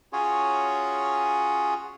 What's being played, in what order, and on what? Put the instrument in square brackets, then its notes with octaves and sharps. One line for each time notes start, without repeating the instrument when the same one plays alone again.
[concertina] C#4 F4 F#4 G#4 C#5